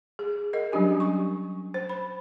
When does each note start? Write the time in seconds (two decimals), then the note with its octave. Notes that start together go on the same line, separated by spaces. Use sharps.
0.19 G#4
0.53 A#4 D#5
0.72 F#3 G3 C#4 D4 G4 G#5
1.00 C#6
1.74 C5
1.89 B5